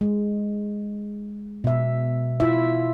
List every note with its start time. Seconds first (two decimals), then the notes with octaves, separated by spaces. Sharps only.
0.01 G#3
1.64 B2 E5
2.40 E4 F4 E5